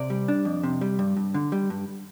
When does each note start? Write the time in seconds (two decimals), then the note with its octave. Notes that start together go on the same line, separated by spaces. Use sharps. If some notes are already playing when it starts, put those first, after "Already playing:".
Already playing: C3 D5
0.10 G3
0.28 D4
0.45 F2
0.63 C3
0.81 G3
0.99 G2
1.17 G2
1.34 D3
1.52 G3
1.70 G2